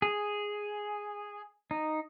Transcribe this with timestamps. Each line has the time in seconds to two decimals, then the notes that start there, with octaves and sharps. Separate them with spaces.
0.02 G#4
1.71 D#4